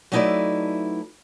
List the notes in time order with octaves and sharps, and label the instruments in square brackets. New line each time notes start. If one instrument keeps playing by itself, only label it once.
[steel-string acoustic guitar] F#3 A3 D#4 E4 B4 D5